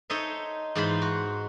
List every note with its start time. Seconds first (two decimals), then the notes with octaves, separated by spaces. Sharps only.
0.10 D#4 A4 C5 C#5 D#5 E5
0.75 G#2 E3 D#4 F4 C5 B5
1.02 F#4